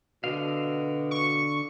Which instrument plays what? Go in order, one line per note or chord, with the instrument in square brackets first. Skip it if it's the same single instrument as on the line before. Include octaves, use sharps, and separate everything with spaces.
[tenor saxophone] B2 [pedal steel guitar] D3 F5
[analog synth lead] C#6